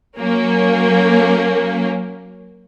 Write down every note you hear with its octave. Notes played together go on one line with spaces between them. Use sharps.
F#3 A#3 C#4